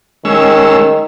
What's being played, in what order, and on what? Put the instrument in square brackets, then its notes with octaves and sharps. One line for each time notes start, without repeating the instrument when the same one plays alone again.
[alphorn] D#3 [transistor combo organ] G#3 C#4 E6